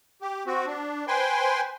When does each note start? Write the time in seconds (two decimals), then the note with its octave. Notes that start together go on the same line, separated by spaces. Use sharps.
0.22 G4
0.46 C4 F#4
0.67 D4
1.08 B4 C5 G5 G#5 C6